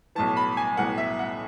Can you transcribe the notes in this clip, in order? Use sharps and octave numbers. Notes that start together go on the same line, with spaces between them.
B1 A2 E3 A5
B5
G#5
B1 A2 E3 F#5
E5
F#5